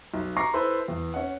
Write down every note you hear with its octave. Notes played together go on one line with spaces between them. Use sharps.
B1
A#5 C#6 D6 A#6 C7
E4 A4 B4 C5
E2
C#4 F#5